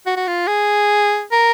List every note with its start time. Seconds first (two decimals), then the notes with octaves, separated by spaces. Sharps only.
0.06 F#4
0.17 F#4
0.27 F4
0.47 G#4
1.32 A#4